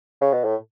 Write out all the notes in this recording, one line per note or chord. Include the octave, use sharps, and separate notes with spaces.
C#3
B2
A2